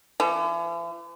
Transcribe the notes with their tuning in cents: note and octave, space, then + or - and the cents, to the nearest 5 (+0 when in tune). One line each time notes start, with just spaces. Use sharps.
E3 +45